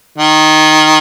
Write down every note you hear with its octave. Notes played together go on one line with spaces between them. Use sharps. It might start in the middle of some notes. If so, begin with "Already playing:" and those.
D#3